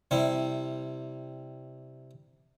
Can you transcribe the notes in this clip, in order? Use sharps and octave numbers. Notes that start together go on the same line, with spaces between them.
C3 G3 E4